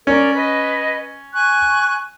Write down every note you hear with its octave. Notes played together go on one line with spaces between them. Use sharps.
C#4 A#4 D5
B4 D#5
G#5 C#6 F#6